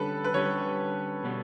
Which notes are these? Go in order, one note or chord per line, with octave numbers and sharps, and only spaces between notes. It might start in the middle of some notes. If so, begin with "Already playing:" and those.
Already playing: D3 G3 C#4 G4 A4 B4
B4
D3 G3 C#4 G4 C#5
B2 G3 B3